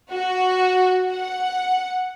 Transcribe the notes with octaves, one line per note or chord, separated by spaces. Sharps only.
F#4
F#5